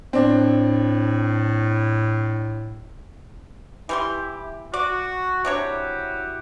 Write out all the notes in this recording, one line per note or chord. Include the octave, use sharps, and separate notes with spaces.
A2 C4 D4
E3 G3 E4 G4 C6
F#4 D5
C3 D4 E4 F#4 G4 C#5